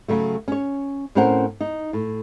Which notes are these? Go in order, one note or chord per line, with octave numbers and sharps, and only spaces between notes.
C#3 F#3 A3
C#4 C#5
A2 C4 C#4 A#4 C5 F#5
D#4
A2